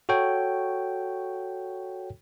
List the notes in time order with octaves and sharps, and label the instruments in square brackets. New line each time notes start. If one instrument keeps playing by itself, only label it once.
[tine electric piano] F#4 A4 C#5 G5